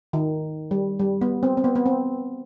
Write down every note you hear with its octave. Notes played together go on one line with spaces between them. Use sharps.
D#3
G3
G3
B3
C4
C4
B3
B3
C4